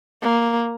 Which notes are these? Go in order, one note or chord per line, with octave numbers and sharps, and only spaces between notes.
A#3